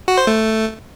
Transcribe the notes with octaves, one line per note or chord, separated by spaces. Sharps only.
F#4
C5
A3